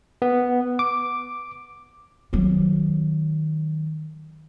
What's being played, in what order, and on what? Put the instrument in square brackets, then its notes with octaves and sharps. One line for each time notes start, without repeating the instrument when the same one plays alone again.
[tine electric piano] B3
D6
[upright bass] D#3 F#3